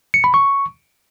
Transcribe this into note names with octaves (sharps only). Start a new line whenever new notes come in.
C#7
B5
C#6